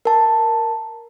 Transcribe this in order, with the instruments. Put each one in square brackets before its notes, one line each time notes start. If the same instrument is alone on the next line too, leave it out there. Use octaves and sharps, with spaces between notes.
[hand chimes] A#4 A5